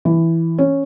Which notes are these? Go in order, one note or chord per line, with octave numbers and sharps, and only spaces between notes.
E3
C#4